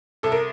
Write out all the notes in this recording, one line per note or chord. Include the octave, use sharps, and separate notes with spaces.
C2 A4
A#4